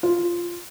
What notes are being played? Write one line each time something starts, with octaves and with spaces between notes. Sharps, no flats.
F4